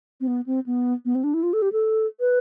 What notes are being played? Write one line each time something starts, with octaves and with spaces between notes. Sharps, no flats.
C4
B3
C4
B3
B3
C4
D4
E4
F4
A4
G4
A4
B4